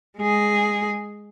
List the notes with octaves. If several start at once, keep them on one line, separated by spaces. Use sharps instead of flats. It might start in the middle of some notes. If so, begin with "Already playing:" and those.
G#3 G#4